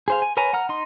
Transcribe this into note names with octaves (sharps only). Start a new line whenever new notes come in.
G#4 C5 F5
G#5
A#4 B4 C#5 G#5 A#5
F#5 A#5 F6
D#4 C6